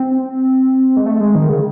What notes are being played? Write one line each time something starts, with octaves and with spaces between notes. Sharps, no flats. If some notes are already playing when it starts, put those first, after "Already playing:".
Already playing: C4
G#3
A3
G#3
D#3
C#3